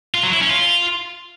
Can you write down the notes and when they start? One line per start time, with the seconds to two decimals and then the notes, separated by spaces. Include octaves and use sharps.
0.14 F4
0.23 F#3
0.32 E4
0.41 C#4
0.49 F4